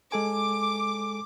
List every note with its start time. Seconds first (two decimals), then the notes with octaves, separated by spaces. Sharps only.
0.12 G#3 A4 G#5 D6